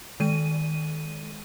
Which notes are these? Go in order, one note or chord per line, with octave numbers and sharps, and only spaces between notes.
D#3 G#3 D#7